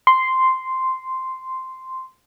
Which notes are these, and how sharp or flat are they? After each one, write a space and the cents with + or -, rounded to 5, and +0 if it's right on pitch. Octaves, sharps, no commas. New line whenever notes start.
C6 -5